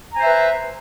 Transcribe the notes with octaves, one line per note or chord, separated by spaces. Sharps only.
B4 C5 E5 G#5 A#5